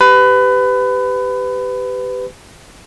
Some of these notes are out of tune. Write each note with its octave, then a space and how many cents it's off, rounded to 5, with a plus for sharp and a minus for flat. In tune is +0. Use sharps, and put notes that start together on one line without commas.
G4 +0 B4 +25